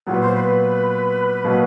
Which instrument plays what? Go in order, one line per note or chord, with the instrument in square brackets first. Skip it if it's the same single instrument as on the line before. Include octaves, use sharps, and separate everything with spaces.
[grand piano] A#2 F#3 B3 [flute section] B4
[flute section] C5
B4
[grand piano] B2 F#3 A#3